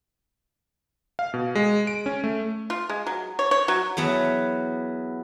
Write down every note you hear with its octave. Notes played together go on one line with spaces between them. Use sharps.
F5
B2
G#3
D7
C#4
A3
F4
G#3
F#3
C#5
C#5
F#3
E2 F#3 B3 A5